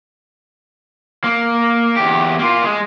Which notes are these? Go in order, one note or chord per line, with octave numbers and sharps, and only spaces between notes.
A#3
E2 G4
A#3 F4
G#3